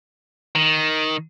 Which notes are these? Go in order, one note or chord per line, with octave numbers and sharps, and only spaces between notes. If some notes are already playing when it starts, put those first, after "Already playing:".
D#3